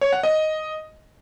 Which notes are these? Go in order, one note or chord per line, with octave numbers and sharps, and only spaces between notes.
C#5
F#5
D#5